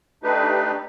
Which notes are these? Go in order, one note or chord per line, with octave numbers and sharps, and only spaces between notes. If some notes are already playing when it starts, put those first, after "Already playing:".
A3 D4 D#4 G4 B4